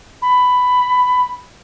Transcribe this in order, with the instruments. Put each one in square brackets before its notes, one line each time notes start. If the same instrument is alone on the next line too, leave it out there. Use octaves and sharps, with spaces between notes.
[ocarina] B5